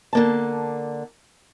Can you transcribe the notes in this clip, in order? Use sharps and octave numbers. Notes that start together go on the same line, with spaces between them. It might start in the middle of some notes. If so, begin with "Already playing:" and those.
D3 A#3 A5